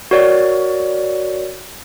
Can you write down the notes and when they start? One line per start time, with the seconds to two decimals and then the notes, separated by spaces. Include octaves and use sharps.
0.11 F#4 A#4 C#5 D5